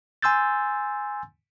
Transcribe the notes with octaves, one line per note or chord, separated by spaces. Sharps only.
G#5 C6 E6 G6 A6